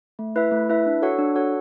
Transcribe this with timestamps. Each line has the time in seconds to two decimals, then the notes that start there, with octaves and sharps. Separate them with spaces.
0.19 A3
0.36 E4 B4 E5
0.52 A3
0.69 E4 B4 E5
0.86 D4
1.02 F#4 A4 C#5 F#5
1.18 D4
1.36 F#4 A4 C#5 F#5